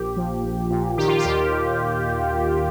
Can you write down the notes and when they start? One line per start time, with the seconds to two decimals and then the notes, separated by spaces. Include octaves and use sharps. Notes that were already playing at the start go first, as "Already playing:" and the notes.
Already playing: A#1 A#2 G4
0.17 F3
0.44 A#1
0.71 A#2
0.98 D#3 G4
1.08 F4
1.18 G4
1.25 D#2
1.52 D#2